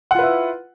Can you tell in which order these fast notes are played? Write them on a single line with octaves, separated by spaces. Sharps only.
F#5 F4 B4 E4